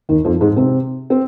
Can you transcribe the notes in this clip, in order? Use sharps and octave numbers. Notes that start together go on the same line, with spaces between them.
D#2 D#3
F2 F3
G#2 G#3
C3 C4
C4